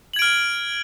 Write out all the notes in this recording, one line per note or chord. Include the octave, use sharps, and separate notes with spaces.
F6 G#6 D7 F#7